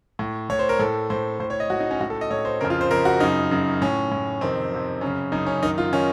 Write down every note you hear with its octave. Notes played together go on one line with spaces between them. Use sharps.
A2
A2 C#5
C5
A#4
A2 A4
A2 C5
A2 C5
C#5
D#5
A2 F#4
D#4
C#4
A2 F#4
A4
D#5
A2 C#5
C5
F2 C#3 A#4
F4
C5
F2 C#3 A#4
F#4
F#2 C#3 D#4
F#2 C#3
A2 C#4
A2
F2 C3 D#3 C4
F2 C3 D#3
F#2 C#3 C#4
F#2 C#3 D#4
C#4
F#2 D#3 D#4
F4
D#3 C#4